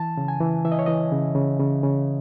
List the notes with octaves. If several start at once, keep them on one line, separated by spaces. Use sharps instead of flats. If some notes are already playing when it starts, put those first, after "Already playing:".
Already playing: E3 A5
C#3
G#5
E3
E3 E5
D#5
C#5
E3 D#5
C#3
C#3
C#3
C#3